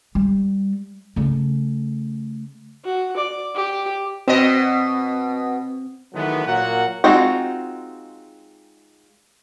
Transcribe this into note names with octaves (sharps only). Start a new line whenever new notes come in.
G3
C#3 A3
F#4
D5
G4
B2 C4 D#5
D#3 E3 F#3 G#3 A3 B3
A#2 F#3 A#3 F#4 A#4 F#5
G#3 C4 D#4 F4 F#4